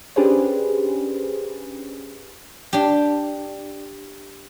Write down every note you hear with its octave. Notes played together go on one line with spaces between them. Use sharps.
C#4 D4 G4 G#4 B4 C5
D4 G4